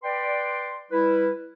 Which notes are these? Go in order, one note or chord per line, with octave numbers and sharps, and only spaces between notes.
B4 D5 G5 C6
G3 E4 B4